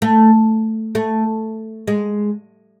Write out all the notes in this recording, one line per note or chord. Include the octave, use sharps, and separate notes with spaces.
A3
A3
G#3